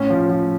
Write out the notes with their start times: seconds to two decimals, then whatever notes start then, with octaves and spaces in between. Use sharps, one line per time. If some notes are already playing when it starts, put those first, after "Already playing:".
Already playing: A2 C#4
0.10 F3
0.30 F3